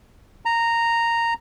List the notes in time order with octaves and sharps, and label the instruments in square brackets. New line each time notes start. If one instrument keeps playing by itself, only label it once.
[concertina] A#5